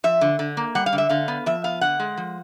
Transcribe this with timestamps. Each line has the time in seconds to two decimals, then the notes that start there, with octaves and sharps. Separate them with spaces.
0.04 F3 E5
0.21 D3
0.39 D3
0.57 A#3
0.75 G3 F#5
0.86 F5
0.93 D3
0.98 E5
1.09 D3 F5
1.28 B3
1.46 F3 E5
1.64 B3 F5
1.81 D3 F#5
2.00 G#3
2.17 F3